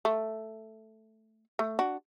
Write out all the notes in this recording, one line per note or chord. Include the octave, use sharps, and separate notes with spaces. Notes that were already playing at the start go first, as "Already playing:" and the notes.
A3
A3
D4 F#4